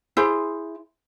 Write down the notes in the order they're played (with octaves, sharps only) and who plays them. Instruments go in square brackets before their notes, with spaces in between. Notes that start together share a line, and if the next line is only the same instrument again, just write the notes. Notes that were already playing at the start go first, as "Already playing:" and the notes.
[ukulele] E4 G#4 C5